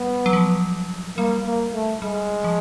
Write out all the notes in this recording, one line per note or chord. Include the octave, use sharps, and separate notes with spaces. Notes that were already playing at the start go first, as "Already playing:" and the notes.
Already playing: G3 B3
F#3
F3
G3 A#3
A#3
A3
G3 G#3
F3